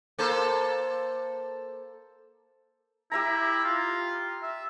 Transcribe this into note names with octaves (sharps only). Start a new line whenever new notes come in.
A#3 A4 C5
E4 G4 E5 A#5
F4
E5